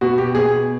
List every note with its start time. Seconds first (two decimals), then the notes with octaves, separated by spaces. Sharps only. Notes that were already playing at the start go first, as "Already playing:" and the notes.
0.01 B2 F#4
0.18 G4
0.35 B2 G#4